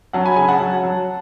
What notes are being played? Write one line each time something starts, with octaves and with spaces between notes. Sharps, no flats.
F#3 F#5 A5
G#5 B5
C#3 G#5 B5
F#5 A5
F#3
F#3